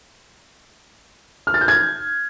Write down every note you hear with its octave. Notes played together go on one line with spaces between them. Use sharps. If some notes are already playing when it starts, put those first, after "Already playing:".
F6
A6
G6
G#6